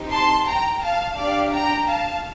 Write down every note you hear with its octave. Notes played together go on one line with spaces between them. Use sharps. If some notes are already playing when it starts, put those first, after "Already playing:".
Already playing: C4 D#4 G4
A5 C6
G5 A#5
F5 A5
D4 G4 D5 F5
G5 A#5
F5 A5